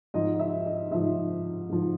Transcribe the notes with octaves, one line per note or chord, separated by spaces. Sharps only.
G#2 F3 D#5
D#5
E5
D#5
G#2 F3 E5
G#2 F3